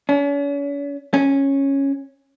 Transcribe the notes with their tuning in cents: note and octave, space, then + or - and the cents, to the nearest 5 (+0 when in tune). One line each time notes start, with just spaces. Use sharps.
C#4 +40
C#4 -10